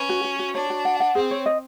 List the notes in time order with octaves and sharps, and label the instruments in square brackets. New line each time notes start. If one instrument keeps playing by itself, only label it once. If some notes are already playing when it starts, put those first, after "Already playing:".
Already playing: [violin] C#4 [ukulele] B4
[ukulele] F#4
F#4
F#4
[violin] D4 [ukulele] C#5
[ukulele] F#4
F#5
F#5
[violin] C4 [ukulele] G#4
[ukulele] C#5
D#5